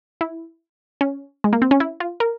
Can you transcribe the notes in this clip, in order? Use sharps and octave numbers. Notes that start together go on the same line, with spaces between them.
E4
C#4
G#3
A#3
C4
C#4
E4
F4
A#4